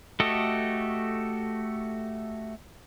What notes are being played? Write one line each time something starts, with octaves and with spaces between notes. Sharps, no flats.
A3 F#4 G4 A4 D#5